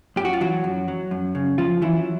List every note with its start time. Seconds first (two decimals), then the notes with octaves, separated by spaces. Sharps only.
0.16 F#2 G4
0.25 F#4
0.33 F4
0.41 E3 F#3 F#4
0.64 F#2
0.88 F#3
1.11 F#2
1.35 C#3
1.58 F#2 F3 F4
1.82 E3 F#3 E4